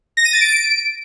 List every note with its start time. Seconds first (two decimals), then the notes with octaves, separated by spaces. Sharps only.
0.17 A#6
0.25 D#7
0.33 A6
0.41 D7